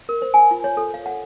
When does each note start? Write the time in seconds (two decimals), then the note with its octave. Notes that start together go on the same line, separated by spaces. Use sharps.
0.09 A#4
0.22 C5
0.34 G#5
0.51 F4
0.64 C#5
0.77 A4
0.94 F5
1.06 F#5